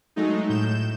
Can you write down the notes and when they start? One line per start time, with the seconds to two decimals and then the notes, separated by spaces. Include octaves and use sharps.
0.16 F#3 G#3 A3 D#4
0.49 A2 G6 E7